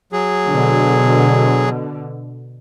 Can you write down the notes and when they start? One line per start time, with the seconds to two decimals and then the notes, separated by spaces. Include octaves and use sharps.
0.13 F#3 G#4
0.45 B2 D3